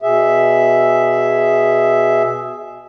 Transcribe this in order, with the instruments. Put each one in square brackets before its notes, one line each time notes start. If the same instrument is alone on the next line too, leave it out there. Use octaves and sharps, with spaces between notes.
[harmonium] B2 G#4 E5